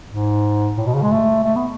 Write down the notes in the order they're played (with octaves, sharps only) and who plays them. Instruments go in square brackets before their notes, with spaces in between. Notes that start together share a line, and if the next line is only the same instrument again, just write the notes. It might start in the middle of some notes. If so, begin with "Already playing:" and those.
[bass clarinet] G#2
A2
B2
C#3
G#3
A3
A3
B3